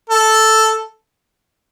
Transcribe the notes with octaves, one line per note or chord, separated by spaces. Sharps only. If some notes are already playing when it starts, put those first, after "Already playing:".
A4